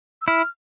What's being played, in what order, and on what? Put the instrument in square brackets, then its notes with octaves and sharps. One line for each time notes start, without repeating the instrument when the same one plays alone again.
[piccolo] E6
[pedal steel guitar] E4 [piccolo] F6